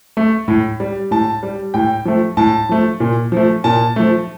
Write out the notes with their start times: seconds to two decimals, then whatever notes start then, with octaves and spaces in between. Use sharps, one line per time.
0.17 A3
0.48 A2
0.80 G3
1.11 A2 A5
1.43 G3
1.74 A2 G5
2.05 F3 A3
2.37 A2 A5
2.69 F3 A3
3.00 A#2
3.32 F3 A3
3.64 A#2 A5
3.96 F3 A3